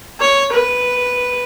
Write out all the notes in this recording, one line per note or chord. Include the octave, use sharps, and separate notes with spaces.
C#5
B4